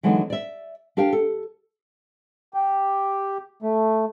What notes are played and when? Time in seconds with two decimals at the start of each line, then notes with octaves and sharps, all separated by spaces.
0.03 D3 E3 F#3 G#3 B3 D#4
0.30 D5 E5
0.97 D4 G4 A#4 F5 G5
1.13 A4
2.54 G4
3.62 A3